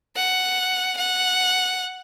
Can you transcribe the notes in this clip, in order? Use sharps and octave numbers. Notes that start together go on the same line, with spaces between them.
F#5
F#5